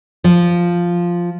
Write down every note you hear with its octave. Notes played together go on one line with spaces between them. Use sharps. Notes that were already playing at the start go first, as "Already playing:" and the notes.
F3